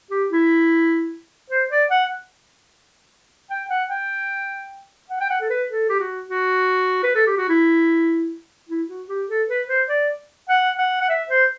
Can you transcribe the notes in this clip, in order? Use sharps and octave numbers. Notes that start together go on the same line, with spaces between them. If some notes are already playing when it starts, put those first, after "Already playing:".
G4
E4
C5
D5
F#5
G5
F#5
G5
F#5
G5
F#5
A4
B4
A4
G4
F#4
F#4
B4
A4
G4
F#4
E4
E4
F#4
G4
A4
B4
C5
D5
F#5
F#5
F#5
E5
C5